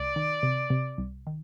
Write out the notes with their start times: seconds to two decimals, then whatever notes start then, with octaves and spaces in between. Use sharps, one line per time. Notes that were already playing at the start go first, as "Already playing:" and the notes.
Already playing: C2 D5
0.16 D#3
0.43 C3
0.70 C3
0.98 C2
1.27 D#3